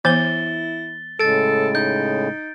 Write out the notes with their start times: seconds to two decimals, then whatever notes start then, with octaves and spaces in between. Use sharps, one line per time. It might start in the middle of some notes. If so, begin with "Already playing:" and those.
0.05 E3 B3 E4 C5 A6 G7
1.20 A2 C#3 G#3 A4 A6 D7
1.75 D#4 G6